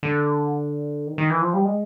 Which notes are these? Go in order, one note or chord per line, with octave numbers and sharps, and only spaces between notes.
D3
D#3
D#3
E3
F3
G3
G#3